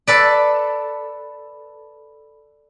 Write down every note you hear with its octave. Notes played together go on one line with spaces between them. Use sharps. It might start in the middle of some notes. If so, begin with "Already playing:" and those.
A4 B4 D5